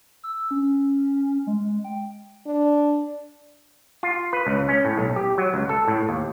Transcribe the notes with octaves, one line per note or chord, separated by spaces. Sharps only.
E6
C#4
G#3
G5
D4
F4
B4
C#2
C#4
A2
B1
G4
F#3
C#2
A4
A2
D#2